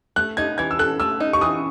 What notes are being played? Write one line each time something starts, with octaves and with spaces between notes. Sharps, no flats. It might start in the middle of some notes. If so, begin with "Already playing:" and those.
A3 F#6
D#4 G#6
E3 G#6
E6
A4 F#6
A3 E6
D#4
C#6
E3 D#6